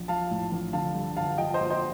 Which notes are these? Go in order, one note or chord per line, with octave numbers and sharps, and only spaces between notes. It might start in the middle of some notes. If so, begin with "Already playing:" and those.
Already playing: A#1
F3 F5 A5
A2
A#1
D3 F5 A5
G2
G1 F5 A5
F3 D#5 G5
C5 D#5
A#2
C5 D#5